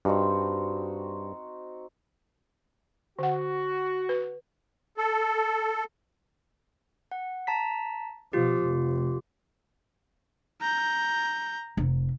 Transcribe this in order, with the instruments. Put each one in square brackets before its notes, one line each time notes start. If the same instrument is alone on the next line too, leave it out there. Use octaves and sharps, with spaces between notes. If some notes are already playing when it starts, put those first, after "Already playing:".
[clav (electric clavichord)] G2 [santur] C4 D#4 F#4
[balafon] D3 F#5 [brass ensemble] F#4
[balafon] B4
[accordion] A4
[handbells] F#5
A5 A#5 B6
[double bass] B2 F3 [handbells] F4 G4
[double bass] F1
[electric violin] A#5 G6
[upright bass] F1